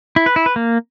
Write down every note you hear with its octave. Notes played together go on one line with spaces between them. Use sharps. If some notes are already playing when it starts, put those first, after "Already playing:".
E4
B4
E4
B4
A#3